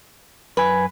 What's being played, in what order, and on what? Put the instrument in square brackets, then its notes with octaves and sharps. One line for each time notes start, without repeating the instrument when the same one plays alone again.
[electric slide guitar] F#2 G#5 [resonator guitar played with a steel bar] B4